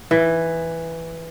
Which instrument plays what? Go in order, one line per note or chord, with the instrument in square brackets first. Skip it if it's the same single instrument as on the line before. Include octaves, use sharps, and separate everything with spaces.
[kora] E3